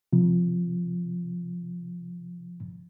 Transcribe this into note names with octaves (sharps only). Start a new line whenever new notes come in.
C3 F3